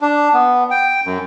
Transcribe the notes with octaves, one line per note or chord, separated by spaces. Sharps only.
D4
B3
G5
F#2